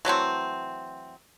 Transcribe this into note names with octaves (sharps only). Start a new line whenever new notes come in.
E3 F#3 A3 C4